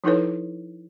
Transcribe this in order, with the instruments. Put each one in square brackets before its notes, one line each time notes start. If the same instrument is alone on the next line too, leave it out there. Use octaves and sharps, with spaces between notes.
[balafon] F3 D#4 E4 A4 B4 C#5